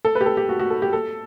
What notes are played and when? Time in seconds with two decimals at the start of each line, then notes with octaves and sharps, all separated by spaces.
0.05 A4
0.15 B4
0.21 G4
0.26 A4
0.37 G4
0.49 F#4
0.59 F#4
0.70 A4
0.82 G4
0.93 A4